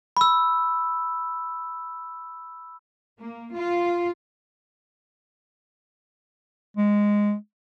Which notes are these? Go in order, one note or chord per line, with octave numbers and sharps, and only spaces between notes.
B5 E6
A#3
F4
G#3